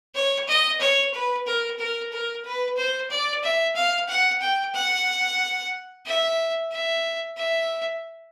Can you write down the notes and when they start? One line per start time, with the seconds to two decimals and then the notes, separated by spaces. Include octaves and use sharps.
0.15 C#5
0.48 D#5
0.80 C#5
1.13 B4
1.46 A#4
1.79 A#4
2.12 A#4
2.45 B4
2.77 C5
3.10 D5
3.43 E5
3.76 F5
4.09 F#5
4.41 G5
4.75 F#5
6.06 E5
6.72 E5
7.37 E5